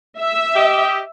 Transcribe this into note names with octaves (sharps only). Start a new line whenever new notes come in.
E5
G4 D#5